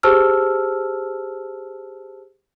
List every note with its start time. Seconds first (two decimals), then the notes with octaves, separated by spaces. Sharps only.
0.03 G4 G#4 C5 A5 E6 F6